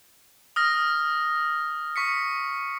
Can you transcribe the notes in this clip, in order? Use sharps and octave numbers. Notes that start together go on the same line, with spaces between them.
D#6 F6 A#6
C#6 B6 C#7